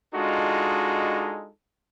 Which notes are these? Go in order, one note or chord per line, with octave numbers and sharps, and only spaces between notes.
G#3 D4 D#4 F4 F#4 A4